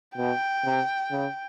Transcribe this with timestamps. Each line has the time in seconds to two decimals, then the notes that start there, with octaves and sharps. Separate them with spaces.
0.17 B2 G5
0.65 C3
1.11 C#3